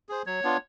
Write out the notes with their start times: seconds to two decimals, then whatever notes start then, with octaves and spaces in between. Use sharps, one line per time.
0.09 G#4 C5
0.26 F#3 C#5
0.43 B3 D4 F4